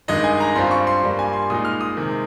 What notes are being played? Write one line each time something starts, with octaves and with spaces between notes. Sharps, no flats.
G2 D#3 G#3 D#4 D#5
G#5
A#5
G2 G3 C4 F4 C6
C#6
C6
G2 G3 A#3
G#5
C6
A#2 G#3 D#4 D#6
F6
D#6
C3 D#3 G#3